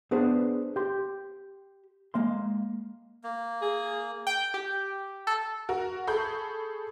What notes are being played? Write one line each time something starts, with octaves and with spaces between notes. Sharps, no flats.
B3 D4 G#4 B4 C5
G4 C6
G#3 A#3 F5 C6
A#3
G#4
G5
G4
A4
F#4 A#4
G#4 A4 B5 C#6 G6